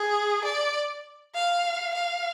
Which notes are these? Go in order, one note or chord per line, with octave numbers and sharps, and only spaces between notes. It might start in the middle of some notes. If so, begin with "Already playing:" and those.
Already playing: G#4
D5
F5
F5